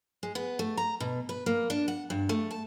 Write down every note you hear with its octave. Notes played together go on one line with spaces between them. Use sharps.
G#3
B3
A3
A#5
B2
B4
A#3
D4
F#5
G2
A3
A5